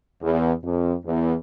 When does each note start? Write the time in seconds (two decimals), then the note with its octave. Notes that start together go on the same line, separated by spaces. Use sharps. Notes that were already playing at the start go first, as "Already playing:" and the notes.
0.22 E2
0.64 F2
1.06 E2